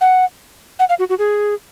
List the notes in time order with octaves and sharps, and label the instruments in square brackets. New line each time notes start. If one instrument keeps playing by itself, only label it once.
[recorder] F#5
F#5
F5
F#4
F#4
G#4